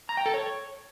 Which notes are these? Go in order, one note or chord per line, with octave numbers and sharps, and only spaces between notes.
A#5
G5
A4
C#5